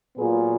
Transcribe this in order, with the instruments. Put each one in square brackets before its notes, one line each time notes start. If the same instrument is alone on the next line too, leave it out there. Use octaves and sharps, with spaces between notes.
[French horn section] A#2 F#3 B3 F4 G#4